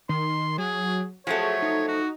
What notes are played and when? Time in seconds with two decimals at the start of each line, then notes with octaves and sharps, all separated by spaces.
0.09 D#3 C6
0.58 F#3 G#4
1.27 F3 F#3 A3 G#4 C#5
1.62 D#4
1.88 F#4